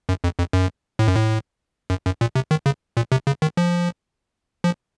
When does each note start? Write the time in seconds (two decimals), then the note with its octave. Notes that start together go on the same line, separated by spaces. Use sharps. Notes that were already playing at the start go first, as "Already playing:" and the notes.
0.09 F#2
0.24 F2
0.39 F2
0.53 F#2
0.99 A2
1.08 F#2
1.16 A2
1.90 F#2
2.06 F#2
2.21 A#2
2.35 C3
2.51 D#3
2.66 C#3
2.97 A#2
3.12 C3
3.27 C#3
3.42 D#3
3.57 F3
4.64 F3